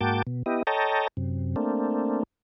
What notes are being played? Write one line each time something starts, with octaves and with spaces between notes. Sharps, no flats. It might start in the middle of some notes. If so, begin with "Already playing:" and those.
G#2 A#3 F#4 G5 A5 D6
B2
B3 E4 G4 D#5
A4 C#5 D#5 G5 A5 A#5
F#2 C3
A3 A#3 C4 D4